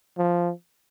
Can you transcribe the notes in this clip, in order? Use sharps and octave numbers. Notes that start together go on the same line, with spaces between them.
F3